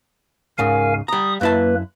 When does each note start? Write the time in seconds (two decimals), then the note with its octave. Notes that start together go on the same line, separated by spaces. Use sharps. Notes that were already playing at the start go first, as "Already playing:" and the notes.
0.58 C#2 G#2 C#3 A#4 F5 G#5
1.08 G3 A#5 D#6
1.41 F#2 A#3 E4 B4 A5